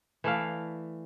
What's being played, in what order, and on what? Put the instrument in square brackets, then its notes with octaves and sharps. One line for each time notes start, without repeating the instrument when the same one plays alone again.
[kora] E3 A3 D5 F5